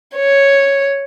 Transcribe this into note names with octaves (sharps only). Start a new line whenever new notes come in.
C#5